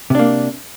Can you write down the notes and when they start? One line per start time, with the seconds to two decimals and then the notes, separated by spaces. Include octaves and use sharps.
0.10 C3
0.15 D4
0.19 A#3